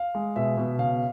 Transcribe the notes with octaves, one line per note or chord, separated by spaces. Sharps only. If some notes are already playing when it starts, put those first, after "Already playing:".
Already playing: F5
G#3
B2 E5
B2
C#3 F5